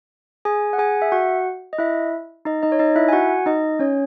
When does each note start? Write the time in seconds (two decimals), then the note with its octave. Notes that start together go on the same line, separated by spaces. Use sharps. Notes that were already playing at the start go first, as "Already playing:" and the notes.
0.45 G#4 G#5
0.73 F#5
0.78 G#4 G#5
1.02 E5
1.12 F#4 F#5
1.73 D#5
1.78 E4 E5
2.45 D#4 D#5
2.63 D#4 D#5
2.72 C#5
2.79 D#4 D#5
2.96 E4 E5
3.09 G#5
3.13 F#4 F#5
3.46 D#4 D#5
3.79 C#4 C#5